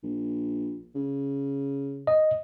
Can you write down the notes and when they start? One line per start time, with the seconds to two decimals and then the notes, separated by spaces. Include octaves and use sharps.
0.03 A#1
0.95 C#3
2.07 D#5